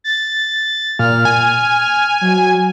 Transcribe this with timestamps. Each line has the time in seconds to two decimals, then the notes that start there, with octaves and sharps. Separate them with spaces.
0.04 A6
0.99 A#2 F6
1.25 G#5
2.22 F#3